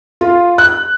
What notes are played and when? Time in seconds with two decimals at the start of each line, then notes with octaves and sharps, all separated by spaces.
0.21 F4
0.58 F#6